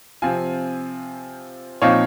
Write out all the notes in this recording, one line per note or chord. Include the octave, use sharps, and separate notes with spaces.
C3 F3 C4 F4 F5 G#5
A#2 F3 C4 D#4 C#5 F5